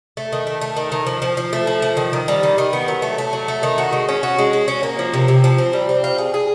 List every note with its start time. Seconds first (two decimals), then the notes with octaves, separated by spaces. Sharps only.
0.17 A3
0.33 D#3
0.47 A3
0.61 A3
0.77 D#3
0.92 D#3
1.07 F3
1.22 F3
1.37 F3
1.53 A3
1.67 F3
1.82 F3
1.97 D#3
2.13 D#3
2.28 G3
2.43 D#3
2.58 D#3
2.73 B3
2.88 F#3
3.02 A3
3.18 A3
3.33 F#3
3.48 A3
3.63 D#3
3.78 F#4
3.93 G#3
4.09 C#4
4.23 F#4
4.39 G#3
4.53 F#4
4.68 C#4
4.83 A#3
4.99 F3
5.13 C3
5.28 C3
5.44 F3
5.58 C4
5.73 G3
5.89 C4
6.04 F4
6.18 G#4
6.34 G#4